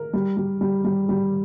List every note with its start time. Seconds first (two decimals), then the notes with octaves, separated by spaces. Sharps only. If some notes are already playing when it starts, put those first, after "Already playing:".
Already playing: A#4
0.13 G3
0.37 G3
0.61 G3
0.84 G3
1.09 G3